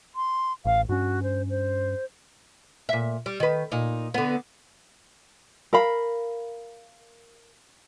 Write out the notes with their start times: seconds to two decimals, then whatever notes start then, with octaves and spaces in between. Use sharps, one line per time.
0.16 C6
0.65 A1 F5
0.89 G2 C#4 F#4
1.23 C5
1.50 C5
2.89 A#2 E5
3.26 G3
3.40 D#3 B4
3.72 A#2 D#4
4.14 D3 B3
5.73 A#4 F5 B5